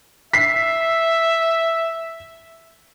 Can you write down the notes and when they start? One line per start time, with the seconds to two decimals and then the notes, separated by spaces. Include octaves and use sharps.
0.33 E5 B6 C7